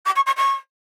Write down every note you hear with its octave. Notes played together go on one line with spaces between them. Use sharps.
D6
C#6
C#6
C#6